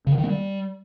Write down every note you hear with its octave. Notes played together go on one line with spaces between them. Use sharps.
C#3
D3
D#3
A#3
G3